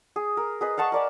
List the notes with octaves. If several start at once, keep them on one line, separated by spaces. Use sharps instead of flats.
G#4
A#4
G#4 B4 D#5
F5 F#5 A5 C#6
A#4 D5 G#5